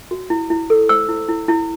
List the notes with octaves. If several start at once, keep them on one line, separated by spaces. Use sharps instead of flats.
F#4
E4
E4
A4
C5 E6
E4
E4
E4